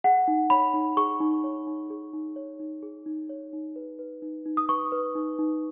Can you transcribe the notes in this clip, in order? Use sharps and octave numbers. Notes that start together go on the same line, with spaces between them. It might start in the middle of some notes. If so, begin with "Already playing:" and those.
G#4 F#5
D#4
C#5 B5
D#4
G#4 C#6
D#4
C#5
D#4
G#4
D#4
C#5
D#4
G#4
D#4
C#5
D#4
B4
B4
D#4
D#4
D#6
B4 C#6
B4
D#4
D#4